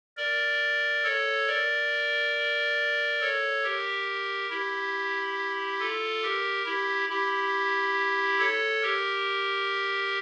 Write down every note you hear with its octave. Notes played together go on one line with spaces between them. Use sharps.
A#4 D5
A4 C#5
A#4 D5
A4 C#5
G4 A#4
E4 G4
F4 A4
G4 A#4
E4 G4
E4 G4
A4 C#5
G4 A#4